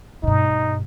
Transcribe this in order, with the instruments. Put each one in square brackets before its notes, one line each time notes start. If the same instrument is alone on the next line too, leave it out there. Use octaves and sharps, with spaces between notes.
[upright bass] G2 B2 [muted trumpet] D#4